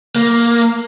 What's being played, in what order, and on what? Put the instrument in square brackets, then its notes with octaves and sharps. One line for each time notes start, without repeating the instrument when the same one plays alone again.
[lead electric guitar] A#3